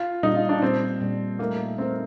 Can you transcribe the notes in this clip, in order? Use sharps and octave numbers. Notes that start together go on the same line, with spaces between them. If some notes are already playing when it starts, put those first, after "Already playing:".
Already playing: F4
A#2 G3 D4 D#4
F4
D4
A#2 G3 C4 D4
A#2 G3 D4
A3 A#3 D#4 A#4
A3 C4 D#4 A#4